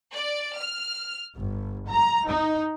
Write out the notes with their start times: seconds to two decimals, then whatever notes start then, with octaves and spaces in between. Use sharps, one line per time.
0.14 D5
0.57 F6
1.35 G1
1.88 A#5
2.26 D#4